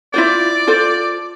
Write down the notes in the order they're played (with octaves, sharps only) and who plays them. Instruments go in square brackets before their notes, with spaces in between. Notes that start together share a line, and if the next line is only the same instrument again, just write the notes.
[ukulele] E4 F4 C5 [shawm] D5
[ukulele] F4 A4 C5